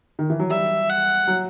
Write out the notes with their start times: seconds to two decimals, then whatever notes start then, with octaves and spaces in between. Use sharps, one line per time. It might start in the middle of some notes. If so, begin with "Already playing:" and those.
0.19 D#3
0.30 E3
0.39 F#3
0.50 G3 E5
0.89 F#5
1.27 F#3